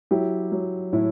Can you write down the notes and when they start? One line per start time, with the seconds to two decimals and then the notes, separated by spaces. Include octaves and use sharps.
0.11 F#3 E4 G4
0.52 F#3
0.93 A2 E4